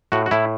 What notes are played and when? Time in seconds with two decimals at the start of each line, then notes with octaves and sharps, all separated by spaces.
0.12 A2 F#4
0.26 F#4
0.31 A2 E4